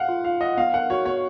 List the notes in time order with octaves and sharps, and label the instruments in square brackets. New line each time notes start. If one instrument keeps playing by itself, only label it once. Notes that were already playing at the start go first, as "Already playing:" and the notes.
Already playing: [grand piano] F5 F#5
[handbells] F4
[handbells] F4 [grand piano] F5
[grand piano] D#5 [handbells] F#5
[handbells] B3 [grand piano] F5
[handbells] A#4 [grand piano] F#5
[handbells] F#4 [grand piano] C#5
[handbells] B3 [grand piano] C#5